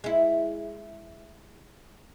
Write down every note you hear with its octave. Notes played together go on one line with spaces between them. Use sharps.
G#3 E4